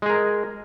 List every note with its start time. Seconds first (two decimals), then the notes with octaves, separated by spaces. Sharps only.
0.02 G#3
0.06 G#4
0.10 A#4